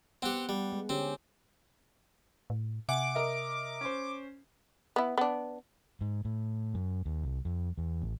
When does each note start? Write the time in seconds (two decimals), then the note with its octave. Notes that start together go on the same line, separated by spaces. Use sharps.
0.22 B3 C4 G4 F#5
0.49 G3
0.72 G#3
0.89 D3 C4 C#4 G4
2.50 A2
2.89 C3 E5 F#5 G#5 D6
3.15 A#4 D#5 E5
3.81 C#4 C5
4.96 B3 E4
5.18 B3 D4
6.01 G#2
6.25 A2
6.74 F#2
7.06 D#2
7.23 C2
7.45 F2
7.78 E2
8.02 A1